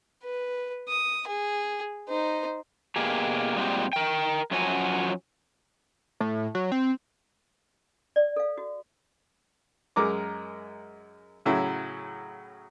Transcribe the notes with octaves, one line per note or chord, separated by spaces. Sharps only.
B4
D#6
G#4
D#4 C5
B2 A#3 G4 G#4
A#2 G3 G#3 C4 F#4 G4
A#4 G5
F#2 F3 F#3 C#4 F#4 G#5
A2
F#3
C4
D5
A4 F5
F#4
F#2 G#3 A#4 D6
A2 C#3 F#3 E4